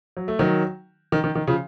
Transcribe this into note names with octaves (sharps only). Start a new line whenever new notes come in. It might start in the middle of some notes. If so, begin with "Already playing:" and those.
F#3
A3
D#3 F#3
D#3
D#3
D#3
C#3 F3